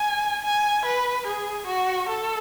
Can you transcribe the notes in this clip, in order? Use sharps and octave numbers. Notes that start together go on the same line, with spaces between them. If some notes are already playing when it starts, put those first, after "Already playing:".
Already playing: G#5
G#5
B4
G#4
F#4
A4